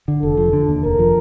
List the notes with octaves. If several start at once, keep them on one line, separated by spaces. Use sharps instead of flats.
D3
F1 A4
F3
D3
D#2
F1 A#4
F3